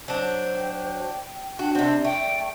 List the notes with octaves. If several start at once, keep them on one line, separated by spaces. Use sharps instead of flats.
F#3 D4 C5
G5
D4 F#4 G5
C3 C4 D5
A3 G5